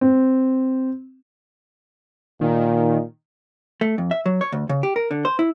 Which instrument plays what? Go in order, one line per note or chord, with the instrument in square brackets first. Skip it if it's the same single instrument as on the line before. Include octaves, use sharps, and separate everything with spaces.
[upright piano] C4
[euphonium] A#2 [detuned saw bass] D#3
[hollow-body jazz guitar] A3
F2
E5
F#3
C#5
D2
C#3
G4
A#4
D3
C5
E4